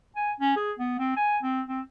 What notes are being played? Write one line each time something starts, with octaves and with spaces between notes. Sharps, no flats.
G#5
C#4
G#4
B3
C4
G#5
C4
C4